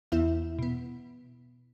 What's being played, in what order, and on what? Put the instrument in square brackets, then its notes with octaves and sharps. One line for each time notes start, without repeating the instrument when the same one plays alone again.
[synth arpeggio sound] E2 E3 B3 E4 E5
B2 B3